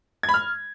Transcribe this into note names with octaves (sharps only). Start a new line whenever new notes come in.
G#6
B5
F6